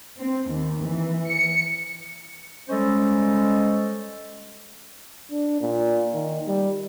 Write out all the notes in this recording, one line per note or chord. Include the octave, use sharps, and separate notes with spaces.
C4
D#2
E3
C#7
G3 G#3 C#4 A4 C5 D#5
D4
A#2
D#3
G3